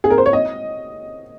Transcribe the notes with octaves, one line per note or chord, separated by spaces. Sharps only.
G#4
A#4
C5
C#5
D#5